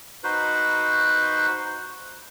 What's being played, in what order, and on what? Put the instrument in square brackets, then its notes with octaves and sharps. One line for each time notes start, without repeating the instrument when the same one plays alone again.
[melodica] D#4 F#4 B4 C5